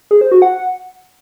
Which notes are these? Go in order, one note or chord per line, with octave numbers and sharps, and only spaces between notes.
G#4
C5
F#4
F#5